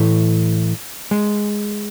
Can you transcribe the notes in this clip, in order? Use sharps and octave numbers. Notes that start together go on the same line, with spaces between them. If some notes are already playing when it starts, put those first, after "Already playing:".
Already playing: A2 E3 A3
G#3